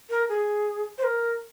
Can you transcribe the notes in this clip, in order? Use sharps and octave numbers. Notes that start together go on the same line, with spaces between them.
A#4
G#4
C5
A#4